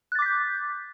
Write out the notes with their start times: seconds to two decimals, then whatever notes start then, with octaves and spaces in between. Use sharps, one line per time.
0.12 F#6
0.15 A6
0.19 D6
0.22 B6
0.26 G6